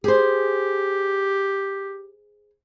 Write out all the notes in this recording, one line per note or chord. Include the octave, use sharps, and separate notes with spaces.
G4 G#4 C5